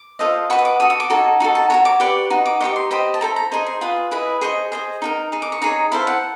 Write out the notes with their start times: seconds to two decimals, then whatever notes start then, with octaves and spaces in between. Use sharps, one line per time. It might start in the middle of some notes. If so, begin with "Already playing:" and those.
Already playing: D6
0.19 F4 A4 C5 D#5
0.50 F#4 B4 D#5 C#6
0.59 D#6
0.65 D6
0.80 F#4 A4 D#6
0.90 D#6
1.00 D6
1.10 D#4 F#4 A4 C#5
1.40 D#4 F#4 A4
1.55 A5
1.70 F#4 A4 C#5 A#5
1.85 D6
2.00 G4 B4 D5 C#6
2.30 D#4 F#4
2.45 D6
2.60 D#4 G4 C5 D#5 C#6
2.76 C6
2.91 G4 C5 D#5 B5
3.14 A5
3.21 E4 A4 C5 A#5
3.36 A#5
3.51 D#4 G#4 C5 D#5
3.66 C6
3.81 F4 G#4 B4
4.11 E4 G#4 B4 D#5
4.41 G#4 C5 D#5 C#6
4.72 G#4 C5 D#5
5.02 D#4 G4 A#4
5.32 D#4 G#4
5.42 D6
5.52 C#6
5.62 D#4 G#4 C#5 A#5
5.92 E4 A4 C5 F5
6.07 F#5